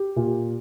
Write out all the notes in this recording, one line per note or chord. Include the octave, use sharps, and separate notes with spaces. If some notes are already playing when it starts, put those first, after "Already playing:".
Already playing: G4
A#2